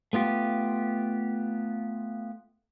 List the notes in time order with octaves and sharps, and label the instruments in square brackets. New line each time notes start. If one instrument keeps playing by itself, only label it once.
[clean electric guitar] A3 B3 F4 G4